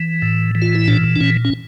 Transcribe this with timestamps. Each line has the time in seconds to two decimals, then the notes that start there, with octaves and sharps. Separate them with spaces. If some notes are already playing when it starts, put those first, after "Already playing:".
Already playing: E3
0.22 A2
0.55 E3
0.62 F4
0.75 E4
0.88 A#2 D4
1.16 D4
1.20 A#2 C#4
1.45 C#4